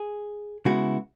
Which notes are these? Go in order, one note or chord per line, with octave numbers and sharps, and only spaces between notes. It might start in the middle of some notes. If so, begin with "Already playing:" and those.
Already playing: G#4
C#3 G#3 B3 E4 F#4